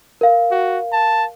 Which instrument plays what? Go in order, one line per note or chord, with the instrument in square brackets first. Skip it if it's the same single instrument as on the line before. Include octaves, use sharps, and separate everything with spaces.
[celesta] A#4 F5
[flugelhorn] F#4
A5